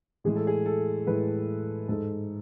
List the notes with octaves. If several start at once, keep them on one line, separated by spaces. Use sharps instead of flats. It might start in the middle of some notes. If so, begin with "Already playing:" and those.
A2 E3 G#3 G#4
A4
G#4
A4
A2 E3 G#3 B4
G#2 G#3 A4